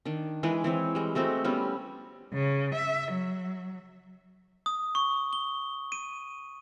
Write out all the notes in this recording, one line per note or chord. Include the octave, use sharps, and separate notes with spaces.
D#3 D4
E3 G#3 G#4 B4
E3 C4 C#5
G3 G#3
G#3 A3 C4 F#4
G3 B3 C#4
C#3
E5
F#3
D#6
C#6
G7
D#7